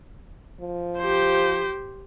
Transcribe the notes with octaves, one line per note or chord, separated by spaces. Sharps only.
F3
G4 C5